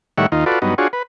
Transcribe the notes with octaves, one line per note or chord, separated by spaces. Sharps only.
A2 D#3 G3 C#5 E5 F#5
D#2 D#4 F4
F4 F#4 A4 B4 D5
G2 F#3 B3 D#4
D4 F4 F#4 G#4 C#5
B4